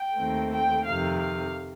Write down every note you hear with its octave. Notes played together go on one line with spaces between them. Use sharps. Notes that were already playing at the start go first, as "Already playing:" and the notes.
Already playing: G5
D#2 D#3 A3 C4
G5
F2 C3 D#3 F5
F5